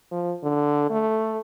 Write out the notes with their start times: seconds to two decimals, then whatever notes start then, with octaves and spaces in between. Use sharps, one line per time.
0.12 F3
0.43 D3
0.90 A3